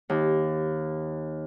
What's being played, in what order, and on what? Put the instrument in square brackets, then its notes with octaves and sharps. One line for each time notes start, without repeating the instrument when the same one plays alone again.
[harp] D#2